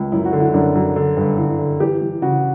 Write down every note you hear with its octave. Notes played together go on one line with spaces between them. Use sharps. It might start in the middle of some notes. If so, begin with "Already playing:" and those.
Already playing: C#2
F#2 E4
F#4
D3
E4
F#2 D4
F#2
D3
G2
D3 E4
D3
E3 G4
E3
C#3 F#4